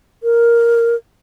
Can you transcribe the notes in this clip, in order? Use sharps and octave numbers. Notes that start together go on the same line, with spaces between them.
A#4